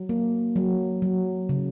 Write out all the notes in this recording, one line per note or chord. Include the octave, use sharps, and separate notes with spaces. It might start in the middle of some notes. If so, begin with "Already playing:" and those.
Already playing: F#3
A#3
F#3
F#3
C#3